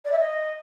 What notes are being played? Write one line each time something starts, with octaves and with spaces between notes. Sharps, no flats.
D5
E5
D#5